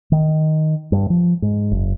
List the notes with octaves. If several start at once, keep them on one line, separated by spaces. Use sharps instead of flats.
D#3
G2
F3
G#2
F#1